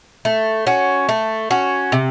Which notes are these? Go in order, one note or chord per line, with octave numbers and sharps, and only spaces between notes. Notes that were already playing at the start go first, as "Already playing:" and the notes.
A3
C#4 F#4
A3
C#4 F#4
C3